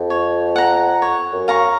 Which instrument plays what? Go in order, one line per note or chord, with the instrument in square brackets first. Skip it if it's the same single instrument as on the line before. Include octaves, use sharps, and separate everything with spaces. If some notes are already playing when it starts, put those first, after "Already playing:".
Already playing: [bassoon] F2
[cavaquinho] C#5
F#5 A#5
C#5
[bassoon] F#2
[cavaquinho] F5 A#5 C#6